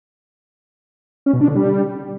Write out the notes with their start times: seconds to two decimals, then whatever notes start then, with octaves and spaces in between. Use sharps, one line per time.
1.26 C#4
1.34 B2
1.41 D4
1.48 D3
1.56 G3